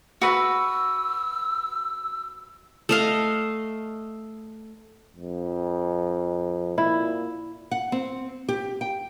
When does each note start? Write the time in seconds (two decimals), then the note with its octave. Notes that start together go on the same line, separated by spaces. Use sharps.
0.21 F#4 B4 E6
2.89 A3 D#5 F5
5.16 F2
6.78 A#2 E4
7.71 F#5
7.92 C4
8.48 G4
8.81 G5